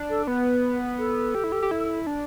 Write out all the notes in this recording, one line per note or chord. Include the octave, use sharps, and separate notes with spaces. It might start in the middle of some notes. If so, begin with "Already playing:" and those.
Already playing: D4
A4
B3 B4
A4
G4
E4
G4
G4
E4
D4